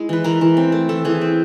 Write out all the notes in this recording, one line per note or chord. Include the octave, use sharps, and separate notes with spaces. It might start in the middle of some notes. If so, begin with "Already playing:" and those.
Already playing: G#3 E4
E3 B4
E3 A#4
E3
C4
A3
E3 A4
E3 G#4
C4